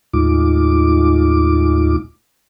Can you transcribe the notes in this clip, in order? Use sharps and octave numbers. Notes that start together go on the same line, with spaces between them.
D#2 A2 G#3 D#4 F4 D6